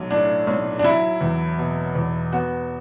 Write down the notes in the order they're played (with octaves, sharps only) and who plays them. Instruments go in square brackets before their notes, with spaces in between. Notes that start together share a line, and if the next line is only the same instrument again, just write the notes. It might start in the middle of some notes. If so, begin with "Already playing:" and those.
Already playing: [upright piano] B1 F#3
[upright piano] A2 [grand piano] D4
[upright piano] B1
[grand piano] D4
[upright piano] F#3 [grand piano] E4
[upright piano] E2
B2
E2
[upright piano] B3 [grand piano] F#4